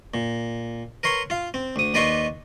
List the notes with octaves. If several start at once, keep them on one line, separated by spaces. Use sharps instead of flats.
A#2
A#4 B4 C#5 C6
F4 F5
C4
D2 D#6
D#2 B4 D5 D#5 C6 C#6